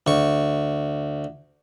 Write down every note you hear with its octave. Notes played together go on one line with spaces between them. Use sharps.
D2 C#6